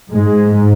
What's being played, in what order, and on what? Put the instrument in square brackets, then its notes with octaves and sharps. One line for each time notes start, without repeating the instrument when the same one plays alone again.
[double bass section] G#2 G#3